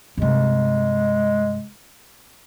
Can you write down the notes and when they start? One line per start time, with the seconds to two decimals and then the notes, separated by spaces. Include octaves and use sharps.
0.17 G2 C3 G#3